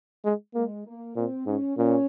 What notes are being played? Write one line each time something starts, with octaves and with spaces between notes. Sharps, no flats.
G#3
G#3 A#3
A#3
A#2 C4
G#2 C#4
A#2 C#4